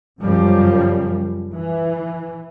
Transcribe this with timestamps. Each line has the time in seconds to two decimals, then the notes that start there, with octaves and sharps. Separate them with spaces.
0.20 F#2 C#3 F3 G3
1.54 E3